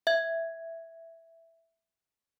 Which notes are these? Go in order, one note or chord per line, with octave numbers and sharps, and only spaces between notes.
E5 G#6